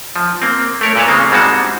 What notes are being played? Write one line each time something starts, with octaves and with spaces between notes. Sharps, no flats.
F3
A#3 C4
A3 A#4 C#5
A#2 B4 C#5 A5
C#3 G#3 A#3 C4
G#2 G3 G#3 C4 F#4 A5